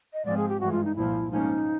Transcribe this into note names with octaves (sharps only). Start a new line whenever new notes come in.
D#5
G#2 F3 G#3 C4 D5
G#4
G4
G2 E3 G#3 F#4
F4
D#4
C2 A#2 F3 E4
G#2 F3 A#3 C#4 D#4